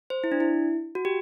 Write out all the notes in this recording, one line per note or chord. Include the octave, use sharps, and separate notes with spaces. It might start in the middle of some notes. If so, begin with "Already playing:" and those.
C5
E4
D4
E4
F#4
G4